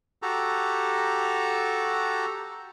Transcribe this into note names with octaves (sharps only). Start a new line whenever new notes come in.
F#4 G4 A4 A#5